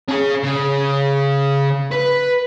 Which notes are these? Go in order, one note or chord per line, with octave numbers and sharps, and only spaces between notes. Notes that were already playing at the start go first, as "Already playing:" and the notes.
C#4 G#4
C#3
B4